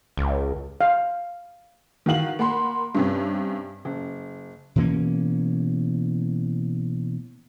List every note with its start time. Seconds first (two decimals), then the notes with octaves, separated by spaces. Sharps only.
0.17 C#2
0.81 F5
2.06 D#3 E3 F#4 F5 F#7
2.39 A#3 F#5 B5 C6
2.95 G2 C3 C#4
3.85 F#1
4.76 B2 E3 A#3 C#4